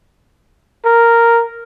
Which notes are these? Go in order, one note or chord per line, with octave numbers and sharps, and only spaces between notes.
A#4